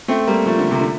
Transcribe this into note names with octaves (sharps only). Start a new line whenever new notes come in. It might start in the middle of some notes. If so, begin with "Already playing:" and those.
A3 C4
G3 A#3
F3 A3
D3 F3
C3
D3